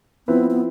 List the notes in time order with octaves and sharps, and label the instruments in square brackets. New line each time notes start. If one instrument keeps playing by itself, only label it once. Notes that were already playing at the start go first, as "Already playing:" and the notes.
[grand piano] F3 C4 E4 B4 [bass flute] B3
[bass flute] B3